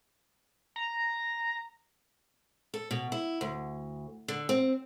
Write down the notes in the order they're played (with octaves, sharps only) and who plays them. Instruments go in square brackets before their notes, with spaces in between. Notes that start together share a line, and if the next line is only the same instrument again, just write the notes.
[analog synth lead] A#5
[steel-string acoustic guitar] A4
B2
E4
D2
D3
C4